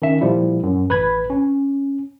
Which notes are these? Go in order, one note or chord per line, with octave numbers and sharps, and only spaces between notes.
D#3 C#4 E5
A#2 F3 G3 E4
F#2
A1 B4 B5 G#6
C#4